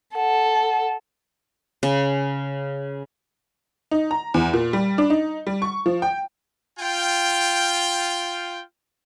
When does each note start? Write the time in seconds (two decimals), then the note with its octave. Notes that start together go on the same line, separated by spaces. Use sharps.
0.15 A4 F#5
1.83 C#3
3.91 D#4
4.11 A#5
4.34 E2
4.53 A#2
4.73 G3
4.98 D4
5.10 D#4
5.47 G3
5.62 C#6
5.86 F3
6.02 G5
6.80 F4 G5